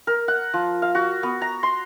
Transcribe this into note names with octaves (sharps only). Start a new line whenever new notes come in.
A#4
F#5
F3
F5
F#4
B3
A#5
C6